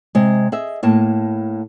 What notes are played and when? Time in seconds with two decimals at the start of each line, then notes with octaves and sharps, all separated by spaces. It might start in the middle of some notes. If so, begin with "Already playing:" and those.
0.15 C3 G#3
0.52 G#4 D#5 E5
0.83 A2 A#3 A5